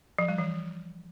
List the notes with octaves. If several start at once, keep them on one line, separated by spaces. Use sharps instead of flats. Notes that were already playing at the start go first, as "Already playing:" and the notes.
F3
G3
E3